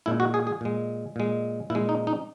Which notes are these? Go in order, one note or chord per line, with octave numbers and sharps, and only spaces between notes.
A#2 G#3 E4
F#4
G#4
G#4
A#2 G#3
A#2 G#3
A#2 G#3 E4
D#4
D#4